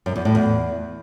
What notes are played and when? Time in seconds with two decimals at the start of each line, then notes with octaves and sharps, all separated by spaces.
0.06 F#2
0.16 E2
0.25 A2
0.35 E2